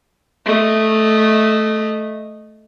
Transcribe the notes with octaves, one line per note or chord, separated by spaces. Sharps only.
A3 D#5